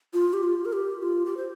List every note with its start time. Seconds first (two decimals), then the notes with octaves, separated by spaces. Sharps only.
0.13 F4
0.33 G4
0.43 F4
0.65 A#4
0.73 G4
1.02 F4
1.26 G4
1.37 C5